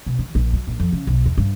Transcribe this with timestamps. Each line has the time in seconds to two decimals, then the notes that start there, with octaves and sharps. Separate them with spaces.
0.06 B2
0.19 D#3
0.35 A#1
0.53 F#3
0.67 A#1
0.80 F2
0.93 C#3
1.07 B1
1.26 E2
1.38 G2